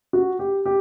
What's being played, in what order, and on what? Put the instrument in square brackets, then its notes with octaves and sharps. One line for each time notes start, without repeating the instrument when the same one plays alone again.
[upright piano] F#4
G4
G4